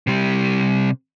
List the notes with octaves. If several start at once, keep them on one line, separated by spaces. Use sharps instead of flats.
C3 G3